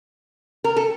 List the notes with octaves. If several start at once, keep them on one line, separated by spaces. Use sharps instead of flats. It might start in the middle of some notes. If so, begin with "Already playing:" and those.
A#4
A4